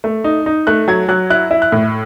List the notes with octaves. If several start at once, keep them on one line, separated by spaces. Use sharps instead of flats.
A3
D#4
D#4
A3 F#6
F#3 G#6
F#3 F#6
E4 F#6
E4
F#6
A2